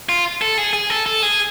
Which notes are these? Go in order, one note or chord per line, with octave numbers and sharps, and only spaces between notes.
F4
A4
G#4
G#4
A4
A4
G#4